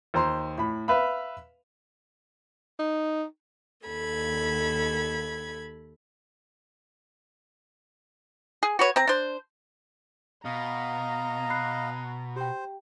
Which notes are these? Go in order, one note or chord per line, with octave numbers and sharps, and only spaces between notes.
D#2 C5 A#5 C6
A2 B5
B4 E5 F5 B5
D#4
D#2 A4 B5 G#6
G#4
F#4 B4 C#5
C4 A#5
D4 C5
B2 D#5 F5 A#5
B5 F#6 C7
G4 C5 G5